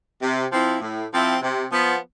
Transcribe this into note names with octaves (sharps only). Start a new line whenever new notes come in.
C3
F3 C4 E4
A2
F3 C4 E4
C3
F3 B3